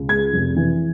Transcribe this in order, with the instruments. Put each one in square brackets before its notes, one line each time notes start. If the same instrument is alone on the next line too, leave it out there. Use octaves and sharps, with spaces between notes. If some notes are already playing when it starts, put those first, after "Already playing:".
Already playing: [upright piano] C#2
G#3 G#6
F1
E3